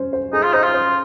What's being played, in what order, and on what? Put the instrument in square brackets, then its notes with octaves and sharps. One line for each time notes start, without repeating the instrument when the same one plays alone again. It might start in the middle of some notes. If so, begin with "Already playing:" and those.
Already playing: [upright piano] C#4 C5
C5
[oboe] D#4 [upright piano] G#4
[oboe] F4
[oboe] D#4 [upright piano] C5
[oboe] F4
[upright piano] C5